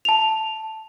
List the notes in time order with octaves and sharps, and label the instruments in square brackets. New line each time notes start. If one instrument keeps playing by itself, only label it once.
[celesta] A5 F7